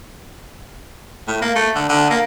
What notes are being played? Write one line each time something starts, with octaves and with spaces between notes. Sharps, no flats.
A2
A#3
A3
D3
D3
A#3